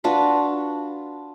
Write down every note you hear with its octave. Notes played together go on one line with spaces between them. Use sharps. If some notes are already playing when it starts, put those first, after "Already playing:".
D4 F4 F#4 B4